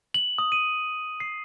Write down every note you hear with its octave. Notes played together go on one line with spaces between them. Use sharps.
F#7
D#6
D#7
C7